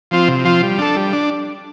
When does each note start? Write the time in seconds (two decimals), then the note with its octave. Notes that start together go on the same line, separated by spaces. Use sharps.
0.11 F3 C4 F4
0.28 C3
0.45 F3 C4 F4
0.63 G3
0.78 D4 A4
0.96 G3
1.13 D4